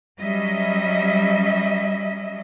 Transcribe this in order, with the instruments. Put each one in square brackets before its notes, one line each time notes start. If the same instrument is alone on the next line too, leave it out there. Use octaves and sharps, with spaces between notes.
[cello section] F#3 G3 C#4 D#5 E5